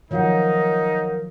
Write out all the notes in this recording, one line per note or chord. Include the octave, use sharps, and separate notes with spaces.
D#3 F3 F#3 D#4 A#4 C#5 F5 F#5